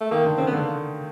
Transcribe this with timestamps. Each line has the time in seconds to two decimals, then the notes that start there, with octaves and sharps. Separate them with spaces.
0.01 A3
0.11 D#3 A#3
0.25 D3
0.37 C#3 C4
0.47 B3
0.53 D3 A#3